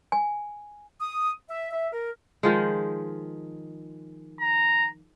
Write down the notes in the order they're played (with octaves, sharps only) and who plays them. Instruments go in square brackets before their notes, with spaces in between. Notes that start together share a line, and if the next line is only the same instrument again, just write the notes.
[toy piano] G#5
[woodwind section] D#6
E5
E5
A#4
[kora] D#3 F3 G#3
[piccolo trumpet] A#5